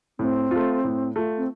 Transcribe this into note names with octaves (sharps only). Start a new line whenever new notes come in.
A2 C4
A3 F4
A2
A3 F4
C4